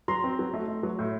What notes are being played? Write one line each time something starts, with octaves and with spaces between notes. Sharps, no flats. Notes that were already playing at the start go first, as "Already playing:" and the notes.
F#3 A#5 C6
C4
F#3
A3
A3
F#3
A2